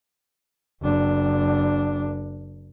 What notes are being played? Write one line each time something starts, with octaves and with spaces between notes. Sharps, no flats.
F#1 D4